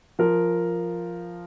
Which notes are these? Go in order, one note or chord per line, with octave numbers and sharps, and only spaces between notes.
F3 A#4